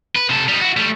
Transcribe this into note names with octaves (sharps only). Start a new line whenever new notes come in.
B4
C3 A4
G3 D#4
E4 F#4
G3 A3